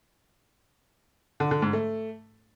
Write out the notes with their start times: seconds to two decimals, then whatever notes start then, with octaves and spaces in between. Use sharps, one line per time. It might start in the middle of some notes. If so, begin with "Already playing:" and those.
1.40 D3
1.51 D3
1.62 G#2
1.73 A3